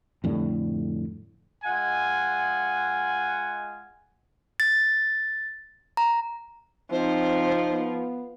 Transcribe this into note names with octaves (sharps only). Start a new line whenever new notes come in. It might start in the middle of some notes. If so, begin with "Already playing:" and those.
F2 A2 D3 G3
G#3 F4 D#5 F#5 G#5
A6
A#5
F3 C4 D#4 C5
B3